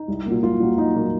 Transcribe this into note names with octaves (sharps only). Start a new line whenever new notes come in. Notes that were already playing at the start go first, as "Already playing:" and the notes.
Already playing: D#4
C2
A#2 F#3 A#3
C2 F4
A#2 F#3 A#3
C2 D#4
A#2 F#3 A#3